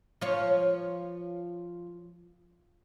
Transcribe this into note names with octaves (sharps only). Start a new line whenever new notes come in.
F3 C#5